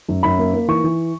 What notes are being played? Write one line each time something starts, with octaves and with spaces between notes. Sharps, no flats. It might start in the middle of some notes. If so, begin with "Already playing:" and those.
F#2
F#2 B5
A#3
A#3
E3 C#6
E3